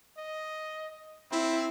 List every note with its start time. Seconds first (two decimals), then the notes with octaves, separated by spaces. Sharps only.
0.18 D#5
1.32 C4 E4